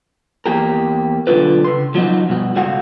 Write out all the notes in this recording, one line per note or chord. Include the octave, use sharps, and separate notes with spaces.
E2 A#3 G4 A#4
B1 D3 F4 B4
C#3 C6
F3 F#3 B3 C4 D#4 F#4
G2 B2 F#4
C#2 A3 F#4 F5 F#5